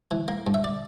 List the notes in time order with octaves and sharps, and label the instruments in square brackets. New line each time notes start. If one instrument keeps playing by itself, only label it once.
[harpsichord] E3
A#3
G2
E5
D5